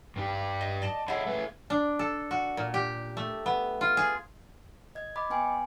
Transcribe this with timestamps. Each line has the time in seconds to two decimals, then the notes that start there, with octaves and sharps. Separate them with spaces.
0.16 G2 D4 G4
0.61 D#5
0.82 D5 D#5 A5
1.08 E4 F4 G#4 C#5 D#5 F#5
1.26 A3 B4
1.70 D4
1.99 A4
2.31 F#4
2.57 A#2
2.74 G4
3.17 A3
3.46 B3
3.81 F4
3.97 G#4
4.95 D#5 G#6
5.16 D#5 B5 D6
5.30 B3 G5 G#5 C6